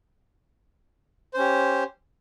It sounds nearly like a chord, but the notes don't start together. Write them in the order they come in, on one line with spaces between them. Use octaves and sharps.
C5 C#4 G4